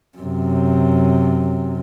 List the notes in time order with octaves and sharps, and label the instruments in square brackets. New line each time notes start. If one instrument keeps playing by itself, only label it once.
[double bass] F#2 C3